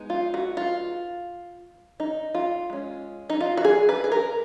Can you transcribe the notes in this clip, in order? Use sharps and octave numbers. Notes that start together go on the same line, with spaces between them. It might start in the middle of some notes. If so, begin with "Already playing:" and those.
Already playing: G#3 B3 D#4
F4
F#4
F4
D#4
F4
G#3 C#4
D#4
F4
F#4
G#4
B4
G#4
A#4